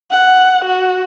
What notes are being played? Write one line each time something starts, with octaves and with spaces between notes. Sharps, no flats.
F#5
F#4